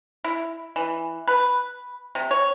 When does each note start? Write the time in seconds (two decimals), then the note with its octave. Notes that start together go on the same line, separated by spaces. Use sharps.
0.24 E4
0.76 E3
1.28 B4
2.15 C3
2.31 C#5